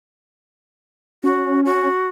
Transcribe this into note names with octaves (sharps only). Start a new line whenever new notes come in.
C#4 F#4
F#4